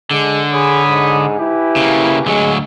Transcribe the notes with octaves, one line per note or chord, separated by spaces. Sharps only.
D3 G#3
G#4 C#5 B5 D#6
G#2
E4 G4 B4 G#5
C#3 A#3
D2 F#3 G#3